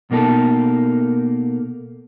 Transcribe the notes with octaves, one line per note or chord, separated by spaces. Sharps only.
B2 A#3 D#4 A4